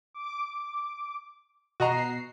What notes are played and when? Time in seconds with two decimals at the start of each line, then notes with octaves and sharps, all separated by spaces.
0.14 D6
1.80 B2 F#4 D#5 A#5 C7